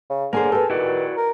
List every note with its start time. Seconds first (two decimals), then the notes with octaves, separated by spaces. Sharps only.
0.10 C#3
0.33 D3 A#3 G#4 A#4 C5 G#5
0.52 G4 A4 B4
0.70 D#3 E4 F#4 D5
1.17 A#4